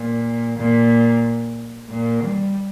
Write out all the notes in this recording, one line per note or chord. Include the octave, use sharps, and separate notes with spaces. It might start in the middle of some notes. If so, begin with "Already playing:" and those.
Already playing: A#2
A#2
A#2
G3